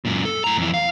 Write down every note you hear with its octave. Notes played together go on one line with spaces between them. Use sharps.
F#2 A#2
A4
A2 A#5
F2 E3
F5